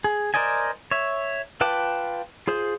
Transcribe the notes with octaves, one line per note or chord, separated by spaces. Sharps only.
G#4
A#4 C5 D5 D#5 G#5
C#5 E5
F4 B4 G5 A5 D6
F4 G#4 C5